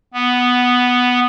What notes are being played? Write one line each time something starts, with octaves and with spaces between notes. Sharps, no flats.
B3